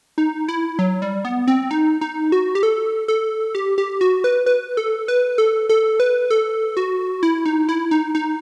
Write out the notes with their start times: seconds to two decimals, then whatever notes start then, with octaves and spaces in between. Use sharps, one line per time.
0.18 D#4
0.48 E4
0.79 F#3
1.02 G3
1.25 B3
1.48 C4
1.71 D#4
2.01 D#4
2.32 F#4
2.55 G4
2.63 A4
3.08 A4
3.55 G4
3.78 G4
4.01 F#4
4.24 B4
4.46 B4
4.77 A4
5.08 B4
5.38 A4
5.69 A4
6.00 B4
6.30 A4
6.77 F#4
7.23 E4
7.46 D#4
7.69 E4
7.91 D#4
8.15 D#4